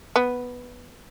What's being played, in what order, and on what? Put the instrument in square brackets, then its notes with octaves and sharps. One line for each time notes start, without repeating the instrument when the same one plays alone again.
[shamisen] B3